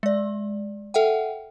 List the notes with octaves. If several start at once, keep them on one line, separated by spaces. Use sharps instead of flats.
G#3 D5
A4 E5 F#5 G5